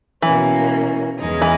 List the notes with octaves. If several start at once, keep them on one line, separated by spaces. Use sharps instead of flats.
B2 E3 A#3 C#4
E2 C#3 G#3 D#4
E3